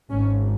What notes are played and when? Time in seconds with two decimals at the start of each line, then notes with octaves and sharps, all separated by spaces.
0.10 G#1 G#2 C#4